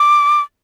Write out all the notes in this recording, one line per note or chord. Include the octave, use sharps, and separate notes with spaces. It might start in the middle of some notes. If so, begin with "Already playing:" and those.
Already playing: D6